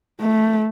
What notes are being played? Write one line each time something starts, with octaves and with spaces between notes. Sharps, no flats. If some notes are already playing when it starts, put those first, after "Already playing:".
A3